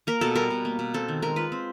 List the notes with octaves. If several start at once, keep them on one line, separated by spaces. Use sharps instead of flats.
A#3 A#4
B2 A4
G3 A#4
B2
A#3
B2
C4 A4
D#3
G#3 A#4
F4 B4
C4